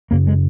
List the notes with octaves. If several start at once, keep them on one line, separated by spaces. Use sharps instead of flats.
F#2 C#3 A#3
G#3